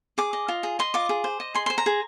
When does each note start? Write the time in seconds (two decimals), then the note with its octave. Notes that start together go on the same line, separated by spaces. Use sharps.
0.18 G#4 D6
0.33 D#5
0.48 F4
0.63 G#4
0.79 D#5 C6
0.94 F4 D6
1.09 G#4
1.24 C5
1.40 D#5
1.54 G#4 C6
1.66 C5 C6
1.78 A#5
1.86 G#4